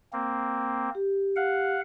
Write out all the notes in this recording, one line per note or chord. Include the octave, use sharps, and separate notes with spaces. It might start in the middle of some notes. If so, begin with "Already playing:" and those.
A#3 C4
G4
F5 F#5